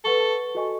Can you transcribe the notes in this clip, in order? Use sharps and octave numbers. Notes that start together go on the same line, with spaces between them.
A4 B4 F#5 A5 C#6
F#4 A4 D#5 G#5 C#6